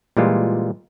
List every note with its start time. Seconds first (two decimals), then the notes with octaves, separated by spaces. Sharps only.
0.17 A#2 E3 G3 G#3 F4